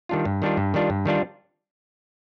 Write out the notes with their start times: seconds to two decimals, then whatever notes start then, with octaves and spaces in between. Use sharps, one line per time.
0.09 D#3 G3 D4 F4
0.25 G2
0.42 D#3 G3 D4 F4
0.57 G2
0.74 D#3 G3 D4 F4
0.90 G2
1.06 D#3 G3 D4 F4